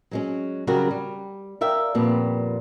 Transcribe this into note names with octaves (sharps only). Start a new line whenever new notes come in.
F#3 G#3 C#4
C#3 F#3 G3 F#4 G4 A#4
G3
A#4 D5 E5 F5 G5
F2 A#2 G3 B3